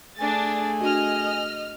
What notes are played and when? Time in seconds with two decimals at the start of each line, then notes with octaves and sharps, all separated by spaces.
0.18 A3 D4 G#4 G#5 A6
0.81 D4 F#4 D#5 F6